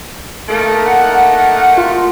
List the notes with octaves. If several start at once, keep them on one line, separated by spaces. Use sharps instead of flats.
A3 A#3 D#4
F#5
F4